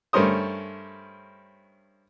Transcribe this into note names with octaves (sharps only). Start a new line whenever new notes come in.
G2 A3 C#4 A#4 C5 D#6